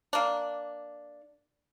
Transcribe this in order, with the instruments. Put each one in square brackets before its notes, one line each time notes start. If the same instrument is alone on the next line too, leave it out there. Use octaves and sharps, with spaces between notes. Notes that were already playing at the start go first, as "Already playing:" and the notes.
[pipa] A#3 D4